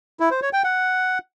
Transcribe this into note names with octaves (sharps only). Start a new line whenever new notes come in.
E4
C5
C#5
G5
F#5